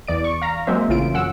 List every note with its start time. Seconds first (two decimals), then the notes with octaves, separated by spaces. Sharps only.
0.07 E2 D5 D7
0.24 C#6
0.42 F5 A#5
0.67 F#3 G#3 A#3 C4 C5 E5
0.89 A1 C#3 F4 D7
1.14 F#2 C#4 F#5 E6